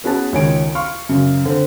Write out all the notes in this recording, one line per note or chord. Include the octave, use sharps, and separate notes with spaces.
B3 C#4 F#4 G#4 B4 A5
C#2 D#3 C#5 G#5 D7
F5 C6 C#6 F6
F#2 C#3
D3 C4